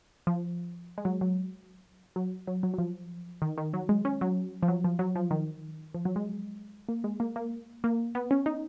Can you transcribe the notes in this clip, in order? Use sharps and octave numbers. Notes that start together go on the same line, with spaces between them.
F3
G#3
F#3
F#3
F#3
F#3
F#3
F#3
F3
D#3
D#3
F#3
G#3
C#4
F#3
F3
F#3
F3
F#3
F3
D#3
F3
F#3
G#3
A#3
G#3
A#3
A#3
A#3
B3
C#4
D#4